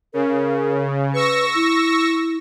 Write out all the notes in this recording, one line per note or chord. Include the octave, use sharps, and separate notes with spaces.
C#3 A#4
B4 C#6 E6 A#6
E4